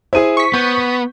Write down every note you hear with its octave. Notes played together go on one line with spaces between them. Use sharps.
E4 G#4 C5 D#7
C#6 B6
B3 G6